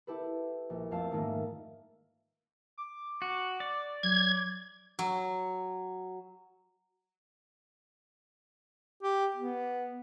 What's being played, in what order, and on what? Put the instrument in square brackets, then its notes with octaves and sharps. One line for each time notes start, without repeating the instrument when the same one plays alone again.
[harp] E4 G4 A4 B4
A#1
F2 A3 F5 A5
G#2 D#3 A3 A#3
[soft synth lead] D6
[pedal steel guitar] F#4
D5
[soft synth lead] F#3 [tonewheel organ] G#6
[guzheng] F#3
[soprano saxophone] G4
B3